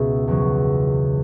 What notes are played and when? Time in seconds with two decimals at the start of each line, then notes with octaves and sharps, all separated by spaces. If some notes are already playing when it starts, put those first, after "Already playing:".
Already playing: C#2 B2 B3 E5
0.28 E2 C#3 F#3